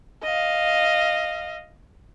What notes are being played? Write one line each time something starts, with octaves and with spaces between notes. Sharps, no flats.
D#5 F5